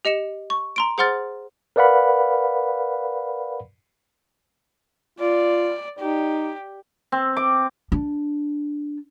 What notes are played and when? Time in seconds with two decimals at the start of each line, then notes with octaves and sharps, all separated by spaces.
0.05 G4 D#5 C#7 E7
0.50 C#6
0.76 A#5 C6 D7
0.98 G#4 C5 F#5 C6 F6 A6
1.76 A#4 B4 D5 F5 F#5 B5
5.19 F4 D5
5.99 D#4 G4
7.12 C4
7.37 D6
7.92 D4